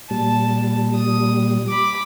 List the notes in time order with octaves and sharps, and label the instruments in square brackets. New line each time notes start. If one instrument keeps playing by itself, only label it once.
[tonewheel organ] A#2 G3 [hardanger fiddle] A5
[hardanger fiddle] D#6
B5 D6